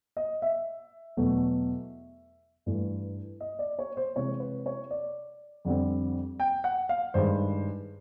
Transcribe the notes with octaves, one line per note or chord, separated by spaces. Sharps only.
D#5
E5
E2 B2 F#3 A3
G2 E3 A3
D#5
D5
C#5
C5
C3 E3 G#3 C4 C#5
B4
C#5
D5
F2 D3 G3 C4
G5
F#5
F5
G2 D#3 G#3 C5